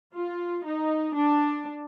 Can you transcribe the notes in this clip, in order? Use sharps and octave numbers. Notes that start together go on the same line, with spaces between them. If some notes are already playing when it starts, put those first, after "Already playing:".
F4
D#4
D4